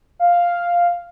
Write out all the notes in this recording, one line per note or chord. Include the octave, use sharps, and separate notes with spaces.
F5